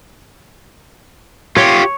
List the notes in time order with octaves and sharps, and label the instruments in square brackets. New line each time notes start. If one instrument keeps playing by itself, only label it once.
[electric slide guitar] F4 G4 [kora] C#5